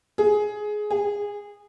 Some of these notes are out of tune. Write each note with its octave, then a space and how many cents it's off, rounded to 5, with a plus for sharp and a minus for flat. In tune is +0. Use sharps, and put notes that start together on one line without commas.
G#4 +15
G#4 -20